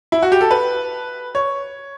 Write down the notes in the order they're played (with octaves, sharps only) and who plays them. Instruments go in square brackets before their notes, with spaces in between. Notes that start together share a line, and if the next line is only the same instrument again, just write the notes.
[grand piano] E4
F#4
G4
A4
B4
C#5